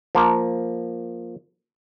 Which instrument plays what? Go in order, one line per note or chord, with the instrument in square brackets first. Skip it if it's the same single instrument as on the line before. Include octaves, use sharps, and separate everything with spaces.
[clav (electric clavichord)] F3 A#3